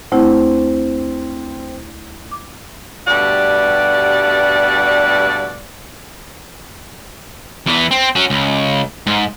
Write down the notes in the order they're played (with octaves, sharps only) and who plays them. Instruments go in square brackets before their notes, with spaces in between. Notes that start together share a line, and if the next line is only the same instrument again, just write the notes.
[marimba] D2 A3 E4 [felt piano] C4
[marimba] D6
[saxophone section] G2 B2 G3 A3 D5 F#5
[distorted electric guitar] E2 E3
C4
C#4 F#4
C#2
G#2